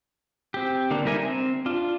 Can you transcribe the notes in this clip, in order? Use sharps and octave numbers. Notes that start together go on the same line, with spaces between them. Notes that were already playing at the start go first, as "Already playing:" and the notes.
C4 G4
D3 A#3 D4
G3 D#4 A#4 E5 G#5
C4
D4 F4